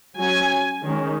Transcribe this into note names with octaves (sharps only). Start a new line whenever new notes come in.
F#3 C#4 G#5
D#3 G#3 C#4